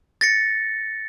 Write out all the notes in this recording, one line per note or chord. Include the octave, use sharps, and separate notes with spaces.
A6 A#6 C#7